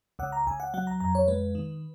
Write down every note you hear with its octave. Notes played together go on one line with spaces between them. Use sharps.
C#2 F#5
A#5
C#2 G#5
F#5
F#3 F#5
A#5
F2 A#5
C#5
G#3 B4
D#3